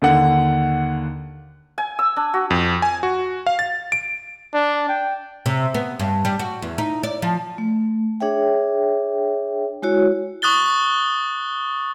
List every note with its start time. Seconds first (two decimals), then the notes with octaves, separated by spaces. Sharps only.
0.02 D#2 D3 F#5
1.78 G#5
1.99 E6
2.16 D4
2.34 F#4
2.50 F2
2.82 G#5
3.03 F#4
3.47 F5
3.59 A6
3.92 D7
4.54 D4
4.89 G5
5.46 C3
5.74 B3
5.99 G2
6.25 G3
6.39 F#4
6.62 E2
6.78 D#4
7.03 D5
7.22 F3
7.58 A3
8.20 D4 G#4 C#5 E5 G5
9.82 G#3 E4 F#4 C#5
10.42 C#6 D#6 F#6 A6 G7